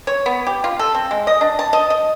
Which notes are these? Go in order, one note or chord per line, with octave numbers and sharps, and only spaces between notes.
C#5
B3
G4
F4
A4
C4
G#3
D#5
D4
A5
D#5
D#5